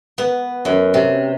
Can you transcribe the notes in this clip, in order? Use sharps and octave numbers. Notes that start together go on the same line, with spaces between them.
B3
F#2
C3